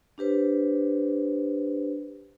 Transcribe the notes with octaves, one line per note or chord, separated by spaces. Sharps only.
D4 G4 B4 C5